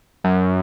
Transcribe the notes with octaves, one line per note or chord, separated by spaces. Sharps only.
F#2